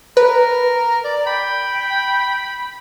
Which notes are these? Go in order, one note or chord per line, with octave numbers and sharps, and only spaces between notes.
A#4 B4
D5
G5 B5